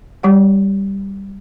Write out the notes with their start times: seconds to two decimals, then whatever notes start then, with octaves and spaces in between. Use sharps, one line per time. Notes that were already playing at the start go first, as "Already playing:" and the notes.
0.23 G3 G4 F#5